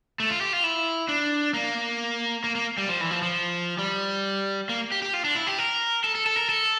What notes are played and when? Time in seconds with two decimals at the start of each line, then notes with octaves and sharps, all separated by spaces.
0.20 A3
0.30 F4
0.41 G4
0.53 F4
0.64 E4
1.09 D4
1.54 A#3
2.44 A#3
2.55 A#3
2.78 G3
2.89 F3
3.01 E3
3.11 F3
3.22 F3
3.79 G3
4.69 A#3
4.92 G4
5.02 G4
5.14 F4
5.25 D4
5.36 E4
5.47 G4
5.59 A#4
6.04 A4
6.15 A4
6.26 A4
6.37 A#4
6.49 A4